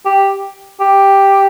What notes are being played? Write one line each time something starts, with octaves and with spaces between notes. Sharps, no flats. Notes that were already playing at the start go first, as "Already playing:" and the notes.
G4
G4